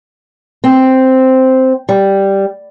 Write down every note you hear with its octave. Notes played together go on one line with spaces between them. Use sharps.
C4
G3